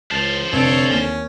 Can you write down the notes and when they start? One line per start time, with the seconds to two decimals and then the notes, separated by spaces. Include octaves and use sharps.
0.11 C#2 C5 A5
0.53 F1 D3 A4 C#5 D7
0.90 D#2 C#4